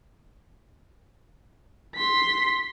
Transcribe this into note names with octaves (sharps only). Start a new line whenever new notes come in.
C6 B6